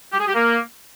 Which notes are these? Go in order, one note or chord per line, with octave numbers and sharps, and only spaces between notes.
G4
G#4
G4
A#3